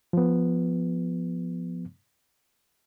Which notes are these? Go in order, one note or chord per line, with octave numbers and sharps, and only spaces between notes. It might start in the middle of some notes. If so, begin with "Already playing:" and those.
F3 B3